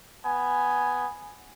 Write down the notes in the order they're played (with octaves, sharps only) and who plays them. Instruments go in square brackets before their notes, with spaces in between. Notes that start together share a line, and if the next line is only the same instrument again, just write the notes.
[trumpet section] B3 G#5